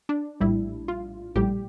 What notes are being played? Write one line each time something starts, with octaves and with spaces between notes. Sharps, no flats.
D4
A#1 A2 G3 E4
F4
A#1 A2 G3 G4